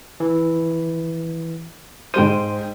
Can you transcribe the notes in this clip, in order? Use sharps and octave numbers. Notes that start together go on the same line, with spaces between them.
E3
G#2 G#3 C5 G5 D#7